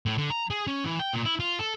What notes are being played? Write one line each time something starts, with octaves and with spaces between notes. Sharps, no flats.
A2
D3
A#5
G#4
C#4
E3
G5
A#2
E4
F4
A4